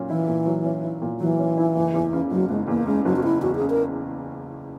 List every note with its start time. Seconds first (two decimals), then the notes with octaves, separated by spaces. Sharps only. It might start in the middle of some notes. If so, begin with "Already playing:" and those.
Already playing: A#2 F#3 C#4
0.10 E3 E4
0.28 A#2
0.46 F#3
0.65 C#4
0.84 E4
1.02 A#2
1.20 E3 F#3
1.39 C#4
1.57 E4
1.76 F#1
1.94 E2
2.13 C#3
2.31 F#1 F#3
2.50 F#1 G#3
2.68 E2 A#3
2.87 C#3 G#3
3.05 F#1 F#3
3.16 F#4
3.23 F#1 E4
3.42 E2 F#4
3.55 C#3 G#4
3.70 A#4